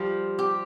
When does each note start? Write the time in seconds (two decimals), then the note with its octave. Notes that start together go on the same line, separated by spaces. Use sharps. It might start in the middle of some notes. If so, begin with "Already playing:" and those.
Already playing: F3 G3
0.39 G4